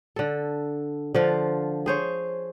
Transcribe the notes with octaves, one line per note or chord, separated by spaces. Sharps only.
D3 A4
D3 F3 F4
G#4 C5 C#5